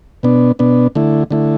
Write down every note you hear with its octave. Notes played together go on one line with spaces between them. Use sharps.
B2 B3 D4
B2 B3 D4
D3 A3 E4
D3 A3 E4